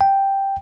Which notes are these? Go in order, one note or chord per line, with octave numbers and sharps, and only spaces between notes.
G5